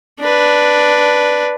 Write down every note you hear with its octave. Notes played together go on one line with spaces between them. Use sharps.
D4 B4